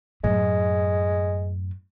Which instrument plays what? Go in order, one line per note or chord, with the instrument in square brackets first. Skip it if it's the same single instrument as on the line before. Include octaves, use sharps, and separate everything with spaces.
[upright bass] F#2 A2 [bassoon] G#3